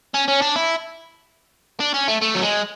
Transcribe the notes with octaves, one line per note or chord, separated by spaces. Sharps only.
C#4
C#4
D4
E4
D4
C#4
A3
A3
F#3
G#3